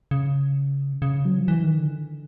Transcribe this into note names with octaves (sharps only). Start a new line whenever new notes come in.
C#3
C#3
F#3
F3
E3
D#3
D3